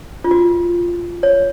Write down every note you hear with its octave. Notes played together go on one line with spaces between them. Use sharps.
F4
F#4
C#5